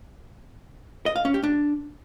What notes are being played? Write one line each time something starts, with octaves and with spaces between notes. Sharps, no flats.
D#5
F5
C#4
G4
D4